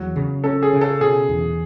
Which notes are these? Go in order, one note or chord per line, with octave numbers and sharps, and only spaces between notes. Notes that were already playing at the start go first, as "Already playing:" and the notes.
Already playing: E2 F#3
C#3
C#4 A4
G#4
C#3
A4
B2 G#4
E2